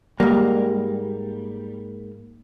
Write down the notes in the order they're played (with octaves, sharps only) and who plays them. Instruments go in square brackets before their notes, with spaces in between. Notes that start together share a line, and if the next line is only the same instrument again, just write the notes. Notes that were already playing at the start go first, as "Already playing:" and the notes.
[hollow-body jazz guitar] G#2 A#3 [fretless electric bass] G3